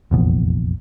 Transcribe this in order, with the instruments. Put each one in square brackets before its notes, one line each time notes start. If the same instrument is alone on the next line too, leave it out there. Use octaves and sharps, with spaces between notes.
[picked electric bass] F1 A#1 E2